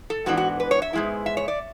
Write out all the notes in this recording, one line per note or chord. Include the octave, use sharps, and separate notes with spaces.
A4
G#2 E3 B3 D4 F#4
F#4
B4
C#5
E5
G#2 G#3 B3 E4
E5
C#5
D5